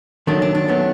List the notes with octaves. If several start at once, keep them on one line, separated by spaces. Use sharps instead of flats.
F#2 D#3 F#3 A3 D4
D4
D4
F#2 D#3 F#3 A3 B3